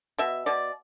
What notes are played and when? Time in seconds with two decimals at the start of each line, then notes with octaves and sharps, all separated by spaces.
0.18 B2 E5
0.46 B2 D5